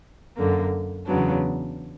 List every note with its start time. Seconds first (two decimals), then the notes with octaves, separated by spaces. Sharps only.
0.38 F#2 D3 A#3
1.07 E2 C#3 F#3 B3 D4